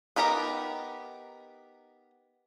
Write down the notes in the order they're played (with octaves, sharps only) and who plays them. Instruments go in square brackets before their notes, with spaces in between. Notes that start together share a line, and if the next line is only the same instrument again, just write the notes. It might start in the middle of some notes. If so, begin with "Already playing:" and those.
[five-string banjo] B3 D#4 G4 A#4 A#5